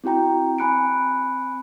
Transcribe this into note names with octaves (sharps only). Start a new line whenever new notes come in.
C4 E4 F#4 G5 A#5
C4 G#5 B5 F#6 C#7 D7